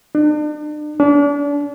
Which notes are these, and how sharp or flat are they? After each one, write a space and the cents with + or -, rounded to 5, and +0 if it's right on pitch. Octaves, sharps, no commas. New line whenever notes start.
D4 +40
D4 -35